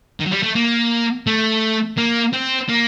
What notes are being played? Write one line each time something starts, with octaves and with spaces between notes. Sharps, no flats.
D#3
F#3
G3
A3
A#3
A3
A#3
C4
A#3